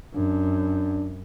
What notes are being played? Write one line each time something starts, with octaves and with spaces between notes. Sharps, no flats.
F#2 D4